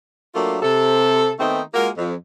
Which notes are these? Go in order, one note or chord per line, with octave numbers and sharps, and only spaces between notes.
F#3 A3 A#3 D4 F4
C3 A4
D#3 A3 B3 C4 D#4
G#3 A#3 F4 F#4 A#4
F2